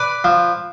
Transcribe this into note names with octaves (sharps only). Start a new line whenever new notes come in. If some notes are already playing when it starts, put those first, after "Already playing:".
Already playing: B4 D5
F3